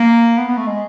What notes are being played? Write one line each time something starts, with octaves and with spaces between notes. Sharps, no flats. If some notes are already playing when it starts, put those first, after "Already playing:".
Already playing: A#3
B3
B3
A3
G#3